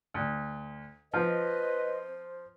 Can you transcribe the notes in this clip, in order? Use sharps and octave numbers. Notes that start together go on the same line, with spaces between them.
D2
F3 B4 C5 D#5